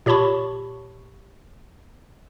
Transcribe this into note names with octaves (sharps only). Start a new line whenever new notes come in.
A#2 G4 C#5 A5 B5 C#6